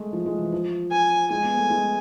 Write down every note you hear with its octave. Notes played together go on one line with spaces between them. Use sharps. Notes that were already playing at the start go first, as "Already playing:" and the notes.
Already playing: G#3 A3
F3
G#3
E3
F3
G#5
G#3 G#5
B3
A3
G#3